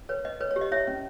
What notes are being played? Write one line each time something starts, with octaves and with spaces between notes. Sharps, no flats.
B4 C#5
B4 D#5
B4 C#5
C#5
G4
D#5
E4 C#5 E5
C#4